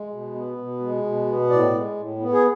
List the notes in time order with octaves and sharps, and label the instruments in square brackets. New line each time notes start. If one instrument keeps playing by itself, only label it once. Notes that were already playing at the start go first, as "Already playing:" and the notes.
Already playing: [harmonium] G#3
B2
B3
B2
G#3
B2
B3
A2 D5
G#3
A2
B3
G#4